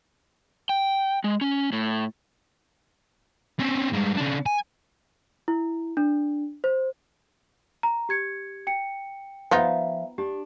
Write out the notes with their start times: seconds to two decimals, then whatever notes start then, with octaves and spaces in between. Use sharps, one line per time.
0.69 G5
1.24 G#3
1.41 C#4
1.72 A2
3.59 C4 C#4
3.93 G2 G#3
4.17 C#3 D4
4.46 G#5
5.48 E4
5.97 D4
6.64 C5
7.83 A#5
8.09 G4 G#6 C#7
8.67 G5 C#7
9.51 F3 B3 D#4 F4 E5 F5
10.18 D4 G4